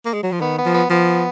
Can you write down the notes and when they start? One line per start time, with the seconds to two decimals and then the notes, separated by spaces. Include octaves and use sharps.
0.06 A#3
0.14 G#3
0.23 F#3
0.32 F3
0.41 D#3 B3
0.58 B3
0.66 F3
0.74 B3
0.90 F3 B3